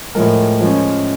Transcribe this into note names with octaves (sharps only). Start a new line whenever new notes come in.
A2 F3 G#3 A#4
F3 G#3 C#4